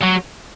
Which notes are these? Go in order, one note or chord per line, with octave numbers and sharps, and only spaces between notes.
F#3